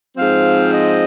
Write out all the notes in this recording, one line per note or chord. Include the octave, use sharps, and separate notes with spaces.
G#2 F3 C4 F5
D#5